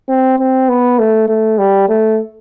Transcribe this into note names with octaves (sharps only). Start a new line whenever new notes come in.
C4
C4
B3
A3
A3
G3
A3